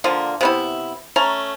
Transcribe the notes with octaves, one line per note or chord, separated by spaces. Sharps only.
D3 F3 A#3
C3 B3 E4
A3 C#4 A#5